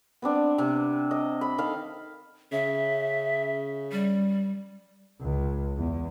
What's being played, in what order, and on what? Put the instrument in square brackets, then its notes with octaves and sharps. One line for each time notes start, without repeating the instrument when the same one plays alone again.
[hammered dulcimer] B3 C4 D4
C3
D#5
B5
D#3 A4 F5
[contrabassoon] C#3 [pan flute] E5
[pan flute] G3
[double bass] C#2
E2